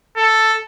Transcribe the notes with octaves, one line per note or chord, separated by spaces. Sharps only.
A4